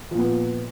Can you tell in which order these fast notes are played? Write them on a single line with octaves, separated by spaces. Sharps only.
F3 A#2 B3